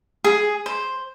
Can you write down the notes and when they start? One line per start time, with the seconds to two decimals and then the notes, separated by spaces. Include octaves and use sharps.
0.24 G#4
0.66 C5